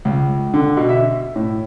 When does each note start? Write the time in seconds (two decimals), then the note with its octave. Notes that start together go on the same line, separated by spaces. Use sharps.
0.05 C#2
0.54 D3
0.77 B2
0.89 E5
1.36 A2